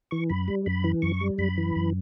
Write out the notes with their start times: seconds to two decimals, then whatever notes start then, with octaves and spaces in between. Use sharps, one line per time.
0.11 E3 C#6
0.30 F#2 B5
0.48 G3
0.66 F#2 B5
0.84 E3
1.02 F#2 C#6
1.21 G3
1.38 F#2 B5
1.57 E3
1.76 F#2